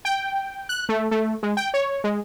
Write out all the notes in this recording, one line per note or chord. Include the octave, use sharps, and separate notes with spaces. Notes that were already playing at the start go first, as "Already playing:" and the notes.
G5
F#6
A3
A3
G#3
G5
C#5
G#3